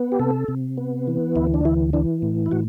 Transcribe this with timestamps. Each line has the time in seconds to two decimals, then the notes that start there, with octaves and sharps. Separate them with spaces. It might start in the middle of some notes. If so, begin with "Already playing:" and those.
Already playing: B3
0.12 G4
0.20 C3 A4
0.48 C3
0.77 B3
1.07 E3
1.36 D2 E4
1.54 D4
1.65 E3 E4
1.93 E3 D4
2.22 A2
2.46 E4
2.51 A2 F#4